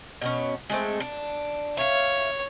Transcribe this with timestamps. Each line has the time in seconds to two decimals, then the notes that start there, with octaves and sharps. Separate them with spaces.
0.21 B2 B3 C#4
0.70 G#3 A3 C4
1.00 D4
1.77 C#5 E5 F5